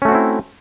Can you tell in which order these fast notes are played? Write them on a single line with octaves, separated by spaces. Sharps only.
C#4 A3 F#4 C4 E4